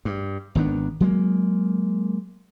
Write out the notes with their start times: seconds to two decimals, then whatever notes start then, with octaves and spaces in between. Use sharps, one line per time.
0.05 G2
0.55 G#1 D#3 B3 D4
1.00 F#3 G#3 A#3